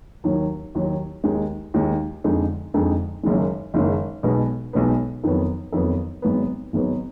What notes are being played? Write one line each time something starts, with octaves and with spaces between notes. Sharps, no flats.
D#2 D#3 F#3
D#2 D#3 F#3
D#2 D#3 G#3 D#4
D#2 D#3 G#3 D#4
F2 D3 G#3 D#4
F2 D3 G#3 D#4
F#1 F#2 D#3 G#3
F#1 F#2 D#3 G#3
B1 B2 G#3 B3
B1 B2 G#3 B3
F2 D#3 F#3 B3
F2 D#3 F#3 B3
G#1 G#2 F#3 B3
G#1 G#2 F#3 B3